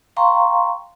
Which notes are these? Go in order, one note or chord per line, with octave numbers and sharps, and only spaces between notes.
F5 G5 A#5 C6 C#6